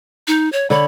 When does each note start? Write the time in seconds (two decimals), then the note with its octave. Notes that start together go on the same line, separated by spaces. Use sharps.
0.27 D#4
0.52 C#5
0.70 D3 C#5 B5